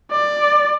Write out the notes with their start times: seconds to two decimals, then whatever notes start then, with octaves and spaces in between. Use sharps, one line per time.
0.12 D5